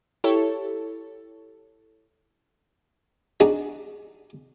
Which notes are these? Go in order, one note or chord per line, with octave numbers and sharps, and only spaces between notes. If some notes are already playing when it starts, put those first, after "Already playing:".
E4 G4 A4 C#5
D4 D#4 F#4 G#4